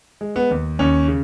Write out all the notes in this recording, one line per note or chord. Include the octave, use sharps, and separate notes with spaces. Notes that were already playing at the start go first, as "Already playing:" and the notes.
G#3
B3
D#2
D#2 C#4
C#3